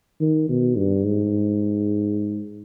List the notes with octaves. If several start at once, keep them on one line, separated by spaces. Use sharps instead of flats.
D#3
B2
G2
G#2